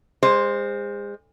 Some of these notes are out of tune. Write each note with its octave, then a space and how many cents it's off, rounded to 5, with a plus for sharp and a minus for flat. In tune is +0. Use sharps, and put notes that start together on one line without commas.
G#3 -35 C5 +0